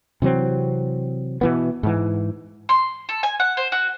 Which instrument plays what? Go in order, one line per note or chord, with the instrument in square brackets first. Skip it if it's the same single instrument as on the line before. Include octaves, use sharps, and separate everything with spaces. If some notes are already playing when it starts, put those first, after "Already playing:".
[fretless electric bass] C3 E3 F#3 C4
B2 E3 B3
G#2 E3
[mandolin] C6
A4
G#5
F#5
C5
F#4